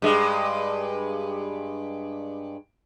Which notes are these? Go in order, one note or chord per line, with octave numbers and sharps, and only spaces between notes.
G2 G#3